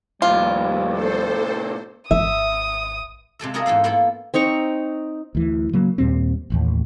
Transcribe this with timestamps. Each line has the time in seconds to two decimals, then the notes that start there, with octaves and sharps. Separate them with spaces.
0.22 D#2 A2 C3 F3 G3 F4
0.90 A4 C5
2.11 G#1 E5 D#6
3.39 C3 G#3 A4 E5
3.54 B3 D4 F4 G#4 A#4 D#5
3.66 G#2 E3 A4 F5
3.84 A#3 B3 E4 F4 A4
4.34 C4 D#4 A#5 C#6
5.35 D2 E3
5.73 C#3 F#3 A#3
5.98 D#2 A#2 G3 C4
6.50 E1 A1 D#2